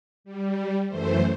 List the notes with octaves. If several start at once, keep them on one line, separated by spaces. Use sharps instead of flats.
G3
F#2 E3 A3 C5